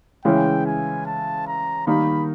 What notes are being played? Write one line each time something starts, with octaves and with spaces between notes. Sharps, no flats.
C#3 E3 G#3 C#4 E4 G5
G#5
A5
A#5
D#3 G3 A#3 D#4 B5